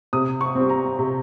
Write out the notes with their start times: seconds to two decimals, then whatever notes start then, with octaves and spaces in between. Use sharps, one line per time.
0.13 C3 D#6
0.41 C#6
0.55 G3 C4
0.69 A#5
0.99 C3